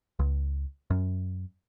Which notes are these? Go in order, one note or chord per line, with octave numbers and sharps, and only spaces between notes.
C#2
F#2